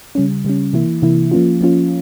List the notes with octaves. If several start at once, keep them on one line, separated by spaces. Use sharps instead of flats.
C#3 G3 C#4
C#3 G3 C#4
C3 E3 A#3 E4
C3 E3 A#3 E4
F3 A#3 C#4 F4
F3 A#3 C#4 F4